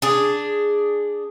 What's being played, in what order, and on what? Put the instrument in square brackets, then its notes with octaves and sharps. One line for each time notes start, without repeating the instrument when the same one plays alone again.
[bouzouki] D4 G#4